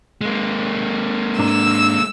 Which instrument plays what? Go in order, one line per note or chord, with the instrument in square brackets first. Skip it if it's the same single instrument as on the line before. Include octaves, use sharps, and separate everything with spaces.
[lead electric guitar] G#3 A#3
[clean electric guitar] G#2 D4 A#5 [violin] E6